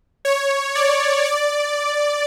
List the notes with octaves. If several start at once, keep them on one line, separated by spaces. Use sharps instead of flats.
C#5
D5
D5